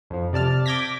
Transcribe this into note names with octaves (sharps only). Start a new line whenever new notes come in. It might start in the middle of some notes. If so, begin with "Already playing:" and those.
F2 F3
C3 D5 A5 F6
D6 G6 G#6 A#6 B6